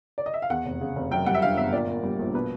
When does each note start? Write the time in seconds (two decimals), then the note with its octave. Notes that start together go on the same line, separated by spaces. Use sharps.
0.18 D5
0.26 D#5
0.34 E5
0.42 F5
0.50 E2 F#5
0.66 F1
0.81 C#3
0.96 F1
1.11 F#2 G5
1.26 G3 F#5
1.35 E5
1.42 D3 F5
1.57 G1 E5
1.72 A#2 D5
1.88 A#3
2.03 G3
2.19 A#1
2.34 B2 B4